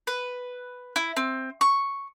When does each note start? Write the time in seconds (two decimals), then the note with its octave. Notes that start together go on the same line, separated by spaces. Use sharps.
0.07 B4
0.96 E4
1.16 C4
1.61 C#6